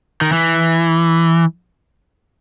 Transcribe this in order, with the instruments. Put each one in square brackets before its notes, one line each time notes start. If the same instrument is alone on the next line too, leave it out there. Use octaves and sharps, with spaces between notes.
[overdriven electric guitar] D#3
E3